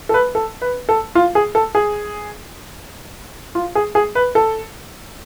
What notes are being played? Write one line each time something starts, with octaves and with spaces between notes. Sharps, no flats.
A4
B4
A4
B4
A4
F4
G#4
A4
G#4
F4
G#4
G#4
B4
A4